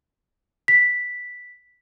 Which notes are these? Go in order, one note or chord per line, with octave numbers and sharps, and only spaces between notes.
B6